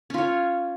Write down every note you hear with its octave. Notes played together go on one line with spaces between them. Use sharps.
C#4 F4 C#5